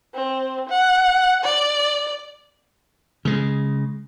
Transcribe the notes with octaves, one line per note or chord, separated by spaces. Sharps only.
C4
F#5
D5
C#3 G#3